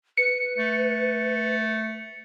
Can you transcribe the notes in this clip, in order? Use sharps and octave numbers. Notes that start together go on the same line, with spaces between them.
B4 C#7
A3